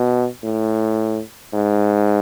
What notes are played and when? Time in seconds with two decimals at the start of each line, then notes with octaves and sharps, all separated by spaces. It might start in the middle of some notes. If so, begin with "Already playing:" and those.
Already playing: B2
0.43 A2
1.53 G#2